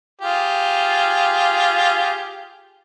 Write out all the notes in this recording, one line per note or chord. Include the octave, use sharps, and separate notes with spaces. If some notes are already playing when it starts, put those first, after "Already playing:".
F4 G4 G#4